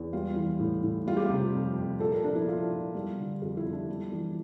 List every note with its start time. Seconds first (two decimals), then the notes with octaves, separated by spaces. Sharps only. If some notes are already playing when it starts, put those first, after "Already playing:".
Already playing: E2
0.13 G3 F4
0.36 E3
0.59 A2
0.84 A2
1.07 G3 F4
1.17 G4
1.26 C3 F4
1.54 F2
1.78 F2
2.00 A#2 A4
2.12 A#4
2.24 F3 D4
2.35 E4
2.48 F3 F4
2.71 A#2
2.95 G3
3.18 D3
3.42 F2 G4
3.57 E4
3.65 F2
3.73 D4
3.89 G3
4.12 E3